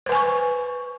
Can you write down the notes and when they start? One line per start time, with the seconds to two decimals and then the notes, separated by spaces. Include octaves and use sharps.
0.06 C5
0.09 B4
0.12 G#5
0.15 C#6